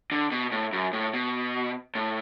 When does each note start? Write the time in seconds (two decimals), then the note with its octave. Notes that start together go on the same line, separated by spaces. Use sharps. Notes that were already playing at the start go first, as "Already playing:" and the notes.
0.12 D3
0.31 B2
0.52 A2
0.73 F#2
0.93 A2
1.14 B2
1.95 A2